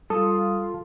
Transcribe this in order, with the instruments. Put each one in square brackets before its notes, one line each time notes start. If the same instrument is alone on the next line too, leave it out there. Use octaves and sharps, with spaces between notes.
[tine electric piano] G3 D#6 [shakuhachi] F4 [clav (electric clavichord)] A4